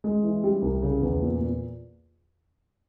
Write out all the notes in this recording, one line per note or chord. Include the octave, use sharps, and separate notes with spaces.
G#3
E3
G3
C2
C#3
E2
A#2
A#2